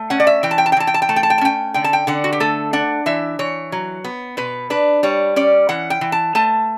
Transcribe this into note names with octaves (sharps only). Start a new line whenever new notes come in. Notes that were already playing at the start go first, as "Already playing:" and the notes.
Already playing: A3
C#4 F#5
D5
E5
E3 G5
A5
G5
A5
G5
E3 A5
G5
A5
G5
A3 A5
G5
A5
G5
A5
C#4 G5
D3 G5
A5
G5
D3 F#5
F#4
G4
A3 A4
D4 F#5
E3 E5
E3 C#5
F#3
B3
B2 B4
D4 B4
G3 C#5
C#4 D5
E3 F#5
G5
E3
A5
A3 A5